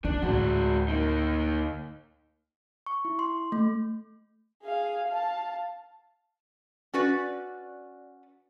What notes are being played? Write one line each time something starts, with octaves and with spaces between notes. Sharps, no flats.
D4 F4
D2 A2 G#3 F#4
A#3 D#4
C#6
E4
C6
A3
G#4 F5
F5 A5
C#4 F#4 B4 D5